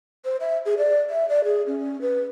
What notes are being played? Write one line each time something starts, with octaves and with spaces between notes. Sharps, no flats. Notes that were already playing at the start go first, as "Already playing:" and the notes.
C5
E5
G#4
D5
E5
D5
G#4
C#4
B4